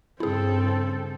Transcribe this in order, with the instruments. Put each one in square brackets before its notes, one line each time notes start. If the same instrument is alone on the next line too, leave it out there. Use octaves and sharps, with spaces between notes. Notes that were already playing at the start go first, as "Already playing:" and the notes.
[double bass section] G2 [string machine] C#3 [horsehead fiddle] C4 A4 [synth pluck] E4 G#4